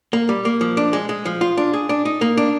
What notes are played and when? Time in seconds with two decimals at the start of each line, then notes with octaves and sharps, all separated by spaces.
0.13 A#3
0.29 G3
0.45 A#3
0.61 F3
0.77 D4
0.93 G#3
1.09 G#3
1.25 F3
1.41 F4
1.57 D4
1.73 G#4
1.89 D4
2.05 D#4
2.21 A#3
2.37 D4